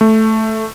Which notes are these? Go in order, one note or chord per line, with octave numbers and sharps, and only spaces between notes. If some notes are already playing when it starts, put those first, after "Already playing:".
A3